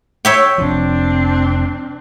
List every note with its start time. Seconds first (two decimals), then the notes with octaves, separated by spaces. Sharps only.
0.25 C#5 E5 G5
0.58 F1 F3 C4 D4